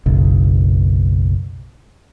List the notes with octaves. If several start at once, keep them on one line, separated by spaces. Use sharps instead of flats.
F#1 B1